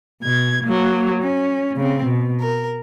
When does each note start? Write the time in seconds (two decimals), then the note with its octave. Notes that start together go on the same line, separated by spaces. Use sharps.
0.23 B2 G#6
0.64 F#3 A#3
1.22 C#4
1.77 C#3 C4
2.06 B2
2.40 A#4